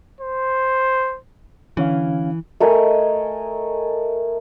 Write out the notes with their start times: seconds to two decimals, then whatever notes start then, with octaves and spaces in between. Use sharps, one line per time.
0.21 C5
1.77 D3 E3 C#4 F5
2.60 A3 A#4 D#5 G#5